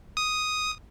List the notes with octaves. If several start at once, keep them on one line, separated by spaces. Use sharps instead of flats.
D#6